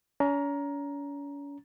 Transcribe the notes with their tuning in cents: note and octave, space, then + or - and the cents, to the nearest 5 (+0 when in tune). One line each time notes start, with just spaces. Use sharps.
C#4 +40 A#5 +10